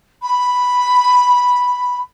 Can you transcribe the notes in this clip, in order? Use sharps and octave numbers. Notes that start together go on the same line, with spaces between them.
B5